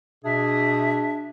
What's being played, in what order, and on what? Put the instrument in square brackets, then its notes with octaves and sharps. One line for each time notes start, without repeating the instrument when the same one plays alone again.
[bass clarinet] B2 [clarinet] D4 [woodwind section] G#4 E5